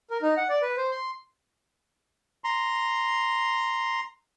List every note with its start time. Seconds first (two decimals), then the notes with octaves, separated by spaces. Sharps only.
0.10 A#4
0.22 D#4
0.37 F#5
0.49 D5
0.62 B4
0.77 C5
0.91 C6
2.44 A#5 C6